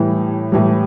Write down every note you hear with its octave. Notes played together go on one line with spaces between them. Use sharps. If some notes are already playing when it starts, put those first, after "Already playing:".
Already playing: A2 E3 G3
A2 E3 G3